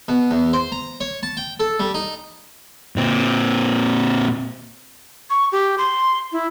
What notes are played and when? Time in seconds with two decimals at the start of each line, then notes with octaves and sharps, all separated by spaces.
0.08 B2
0.31 E2
0.53 C5
0.72 A#5
1.01 C#5
1.23 A5
1.37 G5
1.60 A4
1.80 G3
1.94 D#4
2.96 A#2 C4
5.30 C#6
5.52 G4
5.78 C6
6.32 E4